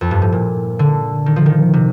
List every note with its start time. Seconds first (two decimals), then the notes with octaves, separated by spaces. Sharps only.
0.01 F2
0.11 G2
0.22 A2
0.32 A#2
0.79 D3
1.26 D#3
1.36 F3
1.46 D#3
1.73 C3